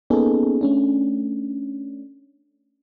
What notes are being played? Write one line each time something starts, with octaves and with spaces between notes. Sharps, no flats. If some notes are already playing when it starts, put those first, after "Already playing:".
A#3 B3 C#4 D#4 G#4 A4
A3 C#4 D4